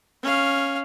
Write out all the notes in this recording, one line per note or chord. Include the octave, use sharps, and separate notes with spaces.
C#4 F5